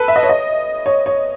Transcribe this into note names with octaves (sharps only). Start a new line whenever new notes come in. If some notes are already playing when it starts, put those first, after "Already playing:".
Already playing: A4 B4
E5
D#5
C#5
D#5
C#5
C#5